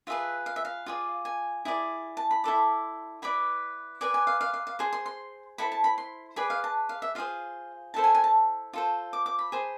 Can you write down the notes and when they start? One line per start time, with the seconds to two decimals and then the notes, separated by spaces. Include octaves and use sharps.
0.07 F4 G#4 B4 E5
0.46 F5
0.56 E5
0.65 F5
0.86 F4 G#4 D5
1.25 G#5
1.65 E4 G#4 D5
2.17 A5
2.31 B5
2.44 E4 A4 D5
3.22 E4 B4 D5 B5
4.01 G#4 B4 D5 G#5
4.14 G#5
4.27 F5
4.41 F5
4.54 F5
4.67 F5
4.79 G#4 C5 C6
4.93 C6
5.06 C6
5.58 E4 A4 C5 B5
5.72 A5
5.84 B5
5.98 C6
6.36 G#4 B4 D5 B5
6.50 F5
6.64 A5
6.89 F5
7.02 E5
7.15 F4 G#4 C5 F5
7.94 E4 A4 C5 A5
8.04 G#5
8.15 G#5
8.24 A5
8.73 F4 A4 C5
9.13 D6
9.26 D6
9.39 B5
9.52 G#4 C5